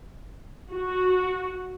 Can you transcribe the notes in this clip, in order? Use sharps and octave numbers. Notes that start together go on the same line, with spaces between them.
F#4